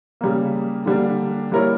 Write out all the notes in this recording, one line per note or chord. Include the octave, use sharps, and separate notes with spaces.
C#3 G3 A#3
D3 G3 A#3 D4
G3 A#3 E4 A#4 C#5